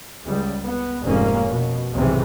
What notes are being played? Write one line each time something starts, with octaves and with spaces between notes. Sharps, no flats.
C#2 G3
B3
F1 G#2 A#3 C#4
B2
B1 E2 G#2 C3 D#3 E3